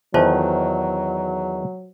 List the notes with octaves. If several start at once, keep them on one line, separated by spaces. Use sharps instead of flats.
E2 D#3 F#3 F4 C5 A5